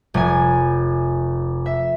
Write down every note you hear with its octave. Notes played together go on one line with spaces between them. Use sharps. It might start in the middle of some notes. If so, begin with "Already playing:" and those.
F1 G#5
E5